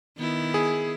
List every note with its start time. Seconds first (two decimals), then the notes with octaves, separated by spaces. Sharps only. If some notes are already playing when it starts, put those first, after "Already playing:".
0.19 D#3 B3 E4
0.54 G#4